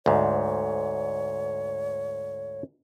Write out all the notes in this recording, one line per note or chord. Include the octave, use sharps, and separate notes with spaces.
D2 G#2 C#5